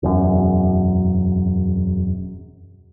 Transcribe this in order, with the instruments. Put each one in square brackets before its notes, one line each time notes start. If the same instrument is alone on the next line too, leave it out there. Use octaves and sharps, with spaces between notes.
[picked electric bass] E1 F#2